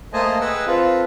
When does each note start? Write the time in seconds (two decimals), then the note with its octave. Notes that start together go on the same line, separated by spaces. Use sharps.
0.13 A3 A#3 C5 D#5 G#5 A5
0.41 G#4 B4 D#5 F#5 G5 E6
0.66 C4 F4 A4 B4